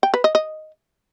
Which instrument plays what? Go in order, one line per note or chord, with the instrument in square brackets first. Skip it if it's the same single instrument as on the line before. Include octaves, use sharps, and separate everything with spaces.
[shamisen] G5
B4
D#5
D#5